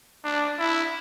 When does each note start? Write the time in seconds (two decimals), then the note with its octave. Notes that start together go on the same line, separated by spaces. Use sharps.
0.25 D4
0.59 E4